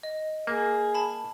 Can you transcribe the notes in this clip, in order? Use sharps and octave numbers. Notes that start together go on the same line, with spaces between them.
D#5
A#3 G#4
A5 B5